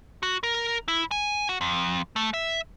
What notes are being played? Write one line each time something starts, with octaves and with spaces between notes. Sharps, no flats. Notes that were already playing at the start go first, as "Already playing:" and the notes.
F#4
A#4
E4
G#5
F#4
F2
A3
E5